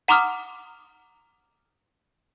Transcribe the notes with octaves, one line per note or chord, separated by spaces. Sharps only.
F#5 A#5 C6 D6 D#6 F6